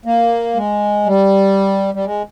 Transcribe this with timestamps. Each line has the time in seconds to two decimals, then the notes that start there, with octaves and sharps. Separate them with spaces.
0.06 A#3
0.55 G#3
1.06 G3
1.94 G3
2.05 G#3